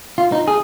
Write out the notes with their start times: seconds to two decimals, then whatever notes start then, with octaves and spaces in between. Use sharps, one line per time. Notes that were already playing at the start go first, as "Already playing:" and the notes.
0.18 F4
0.32 D#4
0.48 G#4